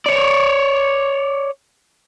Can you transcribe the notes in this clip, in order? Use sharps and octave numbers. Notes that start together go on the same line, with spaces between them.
C#5 D5